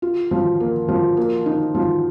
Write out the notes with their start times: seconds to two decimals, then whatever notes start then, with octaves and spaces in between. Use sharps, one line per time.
0.02 F4
0.31 F3
0.60 A#3
0.88 F3
1.17 A#3
1.46 D#4
1.75 F3